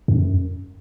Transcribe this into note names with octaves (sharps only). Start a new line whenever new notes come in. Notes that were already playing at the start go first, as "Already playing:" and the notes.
F#2